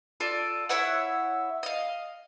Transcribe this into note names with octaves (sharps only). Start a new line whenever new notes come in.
F4 A4 D5
E4 C#5 E5 F#5
D#5 F5